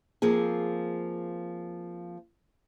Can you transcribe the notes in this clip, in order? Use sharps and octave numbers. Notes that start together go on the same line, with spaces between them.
F3 A#3 C4 G#4